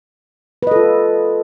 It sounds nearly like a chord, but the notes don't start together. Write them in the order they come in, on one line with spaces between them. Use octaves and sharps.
B4 D#5 A4 F4